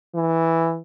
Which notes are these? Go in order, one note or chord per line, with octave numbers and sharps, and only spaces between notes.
E3